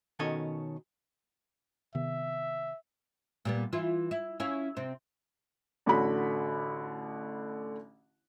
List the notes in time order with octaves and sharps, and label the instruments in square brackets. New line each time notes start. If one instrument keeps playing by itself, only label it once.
[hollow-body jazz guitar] B2 D#3 C#4 A4 C#5 D#5
[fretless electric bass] C3 D#3 B3 [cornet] E5
[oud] A#2 G3 B3
E3 E4 F4
E4
C#4 E4 F5
C3 C4
[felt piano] A1 D3 F#4 B5